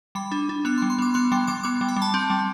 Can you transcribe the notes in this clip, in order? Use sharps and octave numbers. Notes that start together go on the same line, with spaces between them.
G3 B5
D4
D4
B3 B5
C6
G3
C6
B3 D6
B3 C6
G3 C6
G3 D6
B3 D6
G3
B5
G3
A5
C4
G3